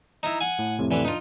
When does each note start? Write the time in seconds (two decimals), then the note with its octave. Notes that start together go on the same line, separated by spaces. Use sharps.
0.23 D#4 E4 A#5
0.41 F#5 G#5
0.59 A2
0.79 F2 A2 C3
0.91 D3 E3 B4
1.05 D4 D#4 F4